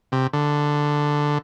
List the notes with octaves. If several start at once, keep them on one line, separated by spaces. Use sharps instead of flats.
C3
D3